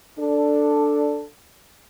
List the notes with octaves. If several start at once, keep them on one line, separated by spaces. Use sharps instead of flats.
D4 A4